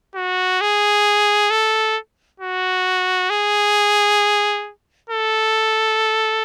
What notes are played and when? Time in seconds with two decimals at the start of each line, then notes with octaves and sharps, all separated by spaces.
0.15 F#4
0.61 G#4
1.51 A4
2.40 F#4
3.30 G#4
5.10 A4